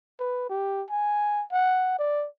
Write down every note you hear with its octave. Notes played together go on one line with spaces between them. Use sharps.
B4
G4
G#5
F#5
D5